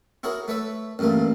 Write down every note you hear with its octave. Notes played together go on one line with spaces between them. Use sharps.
E4 F#4 G#4 A#4 C#5
A3 B4 C#5 E5
A1 G2 A#2 A3 A#3